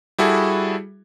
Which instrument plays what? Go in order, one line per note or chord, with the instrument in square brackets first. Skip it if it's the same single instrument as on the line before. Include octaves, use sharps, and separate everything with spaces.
[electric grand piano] G3 E4 F#4 G#4 A4